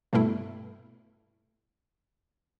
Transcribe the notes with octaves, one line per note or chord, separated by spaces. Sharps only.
G2 B2 G3 A3 E4